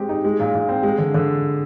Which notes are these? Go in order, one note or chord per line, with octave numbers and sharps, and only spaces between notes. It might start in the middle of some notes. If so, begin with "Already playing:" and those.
Already playing: G#3 C4 G4
D#4
G#3
A#2
A#2
C4
G#3
D3
D3